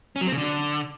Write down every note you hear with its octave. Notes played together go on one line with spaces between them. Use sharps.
C#4
F#3
C4
C#3
D3